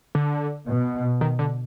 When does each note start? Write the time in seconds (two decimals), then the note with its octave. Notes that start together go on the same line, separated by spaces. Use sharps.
0.15 D3
0.68 B2
1.21 D#3
1.39 D3